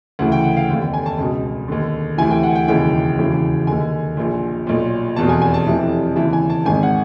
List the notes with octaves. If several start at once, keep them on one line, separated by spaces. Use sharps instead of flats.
D2 C#3 E3 F#5
G5
F#5
F5
F1 D#2 D3 G5
G5
G#5
A5
C#2 B2
D#2 D3
D2 C3 E3 G#5
G5
F#5
G5
E1 D#2 C#3 E3 G5
E1 D#2 C#3 E3
D#2 D3 G#5
A#1 A#2
B1 A#2
F1 E2 B2 A5
G#5
G#5
A5
F1 F2 C3 E3
D#2 C#3 E3 A5
G#5
A5
G#1 G#2 D#3 G#5
F#5